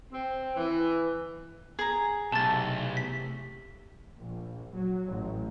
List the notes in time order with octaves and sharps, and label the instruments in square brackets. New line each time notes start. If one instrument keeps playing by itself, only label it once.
[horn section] C4
E3
[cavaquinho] G#4 A#5 [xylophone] G#6
[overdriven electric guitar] B1 [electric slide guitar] C3 E3 A3 [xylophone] A5 A6
[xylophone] B6
[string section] A#1
F#3
A1